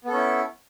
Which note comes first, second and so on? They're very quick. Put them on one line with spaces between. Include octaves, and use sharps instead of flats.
B3 A4 C#4 E4